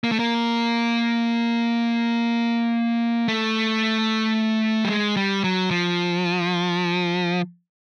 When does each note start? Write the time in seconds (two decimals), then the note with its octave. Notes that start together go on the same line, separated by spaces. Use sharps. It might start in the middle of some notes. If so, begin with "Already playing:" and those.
0.04 A#3
0.12 A3
0.19 A#3
3.28 A3
4.85 G3
4.89 G#3
5.17 G3
5.44 F#3
5.71 F3